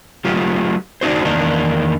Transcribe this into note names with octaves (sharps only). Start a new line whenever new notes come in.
F#3 A3 F4 G4
D4 D#4 F#4 C5
E2 D#3 A#3 D4 D#4